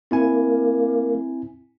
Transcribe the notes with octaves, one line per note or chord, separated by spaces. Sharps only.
A#3 C4 E4 G#5